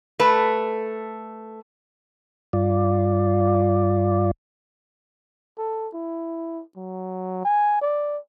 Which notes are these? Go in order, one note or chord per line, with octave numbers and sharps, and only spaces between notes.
A3 A4 B4
G2 F4 D5
A4
E4
F#3
G#5
D5